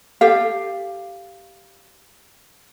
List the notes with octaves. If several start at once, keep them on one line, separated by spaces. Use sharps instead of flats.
G4 A4 F5